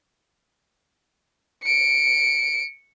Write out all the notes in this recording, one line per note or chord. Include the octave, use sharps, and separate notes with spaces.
C#7 D7